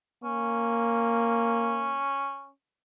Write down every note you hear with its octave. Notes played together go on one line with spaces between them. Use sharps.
A#3 C#4